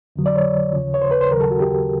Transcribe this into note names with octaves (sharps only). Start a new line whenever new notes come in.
F2 D3 F#3
D5
C#5
D#2 C#3 F3
C#5
C5
B4
C5
D#2 C#3 F#3 A#4
A4
F#4
G4